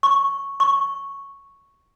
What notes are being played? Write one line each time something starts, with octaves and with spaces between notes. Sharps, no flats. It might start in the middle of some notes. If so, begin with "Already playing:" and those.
C#6
C#6